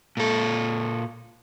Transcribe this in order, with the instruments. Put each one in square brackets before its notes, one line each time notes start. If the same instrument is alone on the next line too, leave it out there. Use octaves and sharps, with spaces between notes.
[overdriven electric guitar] A#2 A4